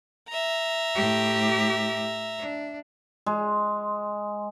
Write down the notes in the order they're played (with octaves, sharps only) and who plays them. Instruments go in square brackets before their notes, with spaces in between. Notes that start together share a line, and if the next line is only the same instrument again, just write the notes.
[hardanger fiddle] E5 A#5
[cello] A2 G4
D4
[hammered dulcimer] G#3